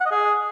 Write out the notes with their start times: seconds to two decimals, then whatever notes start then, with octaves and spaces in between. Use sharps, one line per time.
0.01 F#5
0.06 D#5
0.11 G#4